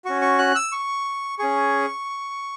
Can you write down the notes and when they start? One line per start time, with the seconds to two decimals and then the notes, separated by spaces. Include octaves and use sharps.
0.05 C#4 F#4 C#6
0.21 C#6
0.39 F#6
0.55 E6
0.72 C#6
1.39 C#4 G#4 C#6